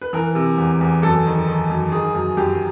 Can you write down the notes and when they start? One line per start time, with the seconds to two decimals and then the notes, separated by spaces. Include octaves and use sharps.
0.01 B4
0.13 E3 A#4
0.35 C3
0.58 E2
0.81 E2
1.02 F#2 A4
1.26 D#3
1.48 D#3
1.70 F#2
1.92 D#3 G#4
2.15 F#2
2.37 F#2 G4